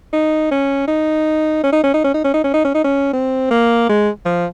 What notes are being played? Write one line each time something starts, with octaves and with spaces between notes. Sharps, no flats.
D#4
C#4
D#4
C#4
D#4
C#4
D#4
C#4
D#4
C#4
D#4
C#4
D#4
C#4
D#4
C#4
C4
A#3
G#3
F3